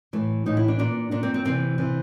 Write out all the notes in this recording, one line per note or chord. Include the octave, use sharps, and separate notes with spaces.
A2 E3 A3
A2 E3 D#4
E4
D4
A#2 D4
A#2 D4
C4
C4
C3 E3 C4
C3 E3